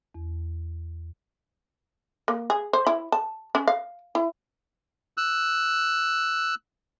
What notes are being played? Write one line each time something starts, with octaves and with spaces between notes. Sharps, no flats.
E2
A#3
G#4
C5
E4
A5
C#4
F5
E4
E6 F#6